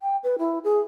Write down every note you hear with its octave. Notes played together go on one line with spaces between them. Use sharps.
G5
B4
E4
G#4